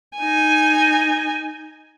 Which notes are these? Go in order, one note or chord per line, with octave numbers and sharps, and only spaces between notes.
D#4 G#5